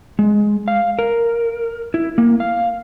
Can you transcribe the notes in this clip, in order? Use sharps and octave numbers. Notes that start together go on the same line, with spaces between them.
G#3
F5
A#4
E4
A#3
F5